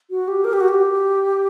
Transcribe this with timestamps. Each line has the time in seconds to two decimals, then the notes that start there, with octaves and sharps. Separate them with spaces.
0.10 F#4
0.28 G4
0.44 A#4
0.53 G4
0.60 F#4
0.68 G4